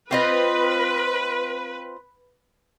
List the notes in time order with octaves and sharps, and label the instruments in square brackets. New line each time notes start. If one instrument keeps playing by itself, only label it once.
[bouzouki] C4 F4 D#5 [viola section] B4